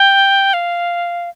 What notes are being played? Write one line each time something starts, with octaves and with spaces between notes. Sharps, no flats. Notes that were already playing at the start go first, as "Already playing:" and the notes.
Already playing: G5
F5